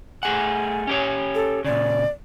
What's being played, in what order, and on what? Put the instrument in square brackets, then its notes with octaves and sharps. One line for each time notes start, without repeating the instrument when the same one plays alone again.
[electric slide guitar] A3 G#4 F#5 [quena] G#5
[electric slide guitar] C#4 G4 C#5
[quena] A4
[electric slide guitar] A#2 C#3 [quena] D5